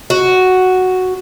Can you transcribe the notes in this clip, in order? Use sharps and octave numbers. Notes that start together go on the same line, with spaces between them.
F#4